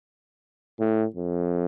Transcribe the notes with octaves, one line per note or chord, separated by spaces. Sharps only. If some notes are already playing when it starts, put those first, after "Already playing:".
A2
F2